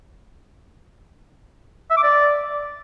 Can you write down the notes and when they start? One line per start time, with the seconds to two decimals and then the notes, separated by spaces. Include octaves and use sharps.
1.91 E5
1.97 D6
2.03 D5